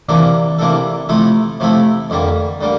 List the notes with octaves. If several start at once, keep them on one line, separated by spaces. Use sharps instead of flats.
C3 E3 A#3 D4 A4
C3 E3 A#3 D4 A4
C3 F3 A3 E4 A4
C3 F3 A3 E4 A4
F2 D3 G3 A#3
D3 G3 A#3